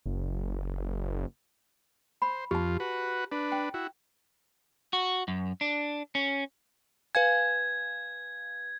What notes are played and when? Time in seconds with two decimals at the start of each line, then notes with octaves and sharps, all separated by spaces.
0.06 F#1
2.22 C5 B5
2.51 F2 F4 G4 A5
2.80 F#4 B4
3.32 D4 B4
3.52 G5
3.74 E4 F#4
4.93 F#4
5.28 F#2
5.61 D4
6.15 C#4
7.15 B4 F5 G#5 G#6